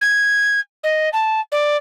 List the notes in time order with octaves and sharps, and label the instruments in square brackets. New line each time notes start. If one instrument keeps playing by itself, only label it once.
[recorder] G#6
D#5
A5
D5